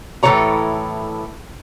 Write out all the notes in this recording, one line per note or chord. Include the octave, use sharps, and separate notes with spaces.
A2 E3 F#3 A4 C#5 A#5